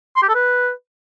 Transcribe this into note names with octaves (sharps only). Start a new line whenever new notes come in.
C6
G4
A4
B4